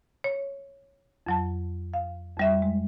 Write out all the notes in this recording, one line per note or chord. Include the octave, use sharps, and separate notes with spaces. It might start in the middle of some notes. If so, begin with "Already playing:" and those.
C#5
F2 F#3 A5
F5
F2 G3 E5
G#3